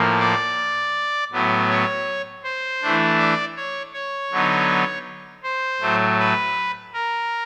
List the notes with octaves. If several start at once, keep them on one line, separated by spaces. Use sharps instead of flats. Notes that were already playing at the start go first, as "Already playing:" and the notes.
Already playing: A2 F3 A#3
D5
A2 F#3 B3
C#5
C5
E3 A3 D4
D5
C#5
C#5
D3 F#3 B3 D#4
C5
A2 F#3 A3
B4
A#4